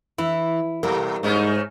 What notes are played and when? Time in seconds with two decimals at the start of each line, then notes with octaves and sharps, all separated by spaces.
0.18 E3 E4
0.83 B2 G3 A#4
1.23 G#2 A3 C#4 D#4